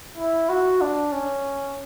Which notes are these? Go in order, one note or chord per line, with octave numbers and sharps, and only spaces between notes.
E4
F#4
D4
C#4